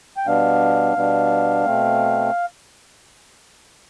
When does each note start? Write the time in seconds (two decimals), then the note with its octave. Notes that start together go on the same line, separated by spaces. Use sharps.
0.17 G5
0.26 B2 G3 B3 D4 F5
0.96 B2 G3 B3 D4
1.65 B2 A3 C4